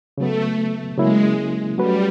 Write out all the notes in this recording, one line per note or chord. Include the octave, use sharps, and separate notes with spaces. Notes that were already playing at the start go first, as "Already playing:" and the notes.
C#3 F#3 A3 B3
C#3 F#3 G#3 A#3 C#4 E4
F#3 G3 A3 C#4 F#4 B4